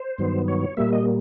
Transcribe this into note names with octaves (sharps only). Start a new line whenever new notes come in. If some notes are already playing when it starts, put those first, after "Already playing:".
Already playing: C5
G2 D#3 F#3 B3
C#5
A#2 G3 A#3 E5
D#5